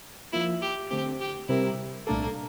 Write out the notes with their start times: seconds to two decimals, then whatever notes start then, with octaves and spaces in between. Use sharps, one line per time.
0.33 F3 A#3 E4 F4
0.62 G4
0.90 D3 A3 C4 G4
1.20 G4
1.48 C3 G3 C4 E4 G4 A#4
2.07 C2 A#2 A3 A#3 D4 A4